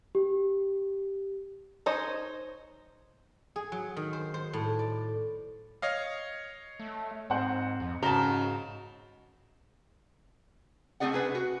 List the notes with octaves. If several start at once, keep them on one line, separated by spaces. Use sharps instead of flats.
G4
D#4 C5 C#5 D#5
G#4
F#3
D#3
C5
C5
A2
D5
C#5 D#5 F5
A3
G#2 C4 C5 F#5
F2
G#2 C#3 F#4 A5 A#5 G7
A3 C4 D#4 G#4 D5 F#5
C3 D4 G#4 B4
F#4